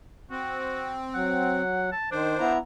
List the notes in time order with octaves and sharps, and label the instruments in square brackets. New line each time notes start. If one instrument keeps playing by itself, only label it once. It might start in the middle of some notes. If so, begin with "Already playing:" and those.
[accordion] C4 [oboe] F#4
[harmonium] F#3 [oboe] F#5
[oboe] A5
[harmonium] D#3 [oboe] D4 [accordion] C5
[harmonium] B3 E4 A#5